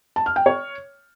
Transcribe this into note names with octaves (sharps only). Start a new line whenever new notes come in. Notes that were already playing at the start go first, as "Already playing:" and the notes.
A5
F6
G5
C#5